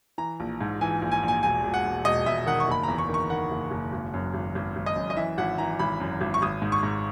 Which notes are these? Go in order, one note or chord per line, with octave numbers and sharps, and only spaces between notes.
E3 A#5
A#1
G#2
E3 G#5
A#1
G#5
A#1
G#5
E1 G#5
E1
F#5
E1
E1 D#5
E1 E5
D#3 F#5
C#6
F#1 B5
E2 A#5
C#6
D#3
C#6
D#3 F#5
F#1
F#1
G#1
F#2
G#1
G#1
G#1
D#5
F#2
D#5
E3 E5
G#1 F#5
E3 A#5
G#1 B5
F#2
G#1
C#6
G#1 D#6
G#2
C#6
G#2